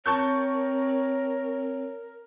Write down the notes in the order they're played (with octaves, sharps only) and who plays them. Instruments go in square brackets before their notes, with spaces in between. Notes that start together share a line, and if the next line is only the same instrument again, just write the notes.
[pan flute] C4 [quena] A#4 [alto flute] C#5 [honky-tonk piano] A5 C#6 G6